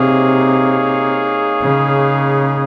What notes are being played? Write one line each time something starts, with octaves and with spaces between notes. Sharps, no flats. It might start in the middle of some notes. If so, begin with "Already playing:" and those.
Already playing: C3 A#3 D#4 G#4 C#5 F5
C#3